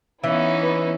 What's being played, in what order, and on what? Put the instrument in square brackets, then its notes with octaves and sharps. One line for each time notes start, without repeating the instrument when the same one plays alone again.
[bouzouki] E3 [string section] B3 E4 [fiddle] C#4 D#4
[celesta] B4